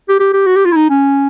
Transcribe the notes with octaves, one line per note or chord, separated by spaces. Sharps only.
G4
G4
G4
F#4
G4
F4
E4
D#4
C#4